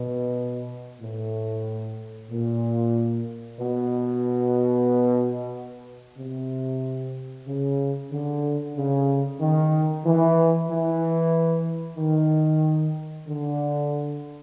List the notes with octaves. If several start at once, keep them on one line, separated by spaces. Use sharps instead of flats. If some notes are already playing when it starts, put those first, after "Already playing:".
Already playing: B2
A2
A#2
B2
C3
C#3
D3
C#3
D#3
E3
E3
D#3
D3